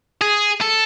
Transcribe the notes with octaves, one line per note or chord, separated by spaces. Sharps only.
G#4
A4